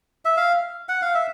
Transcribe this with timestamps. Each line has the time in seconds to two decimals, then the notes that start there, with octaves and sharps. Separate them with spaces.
0.25 E5
0.37 F5
0.89 F#5
1.02 F5
1.14 E5